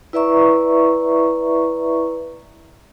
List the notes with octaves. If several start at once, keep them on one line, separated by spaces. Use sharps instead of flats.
E4 B4 D5 E5 A#5 C#6